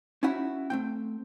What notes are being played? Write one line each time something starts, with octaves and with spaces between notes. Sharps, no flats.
C#4 D#4 E4 F#4 F#5 B5
A3 C4 G5